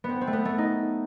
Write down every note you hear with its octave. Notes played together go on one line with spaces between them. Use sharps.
B3
C4
C4
A3
B3
A3
D#4